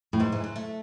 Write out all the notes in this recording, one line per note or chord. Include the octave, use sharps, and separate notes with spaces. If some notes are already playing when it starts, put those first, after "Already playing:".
A2
G#2 E3
E3
F#3
A3